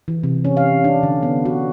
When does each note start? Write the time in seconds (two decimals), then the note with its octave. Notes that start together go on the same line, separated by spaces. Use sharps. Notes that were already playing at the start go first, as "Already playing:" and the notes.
0.08 E3
0.23 C3
0.45 C#4
0.57 F5
0.84 D4
1.03 D3
1.23 B3
1.45 F#4